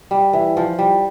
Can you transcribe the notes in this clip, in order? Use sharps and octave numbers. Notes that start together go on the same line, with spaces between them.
G3
E3
F3
G3